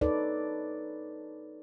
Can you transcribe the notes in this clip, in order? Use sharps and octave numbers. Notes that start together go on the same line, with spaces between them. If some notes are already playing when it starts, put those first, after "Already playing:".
D#4 A4 B4 C#5 D5